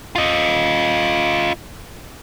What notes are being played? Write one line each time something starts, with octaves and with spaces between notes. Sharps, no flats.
F4 D#5